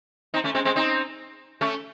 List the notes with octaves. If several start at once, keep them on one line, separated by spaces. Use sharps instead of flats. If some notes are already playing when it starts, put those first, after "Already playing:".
C4 D#4
A3 C#4
G#3 C4
G#3 C4
C4 D#4
A3 C#4